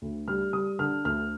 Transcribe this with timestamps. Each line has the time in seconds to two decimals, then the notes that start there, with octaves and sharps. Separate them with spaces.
0.02 D2
0.28 G3 F6
0.53 G3 D#6
0.79 D3 F6
1.05 D2 F6